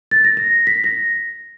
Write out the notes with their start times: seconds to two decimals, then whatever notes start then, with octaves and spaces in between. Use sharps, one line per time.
0.11 A6
0.24 A#6
0.37 A#6
0.67 B6
0.84 A#6